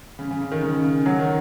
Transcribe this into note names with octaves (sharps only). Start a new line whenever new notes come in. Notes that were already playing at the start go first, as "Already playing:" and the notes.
C#3
C#3
C#3
D#3
C#3
C#3
F#3
D#3